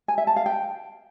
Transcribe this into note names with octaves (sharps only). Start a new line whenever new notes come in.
G#5
E5
A5
F5
G5